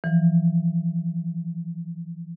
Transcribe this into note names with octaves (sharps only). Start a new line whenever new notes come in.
E3 F3